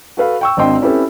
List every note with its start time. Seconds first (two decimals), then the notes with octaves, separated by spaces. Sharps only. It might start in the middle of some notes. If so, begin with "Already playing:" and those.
0.17 F#4 A4 B4 F5
0.41 G5 C#6 E6
0.57 G#1 C4 D4 D#5 G5 C6
0.81 C4 C#4 E4 G4 A4 B4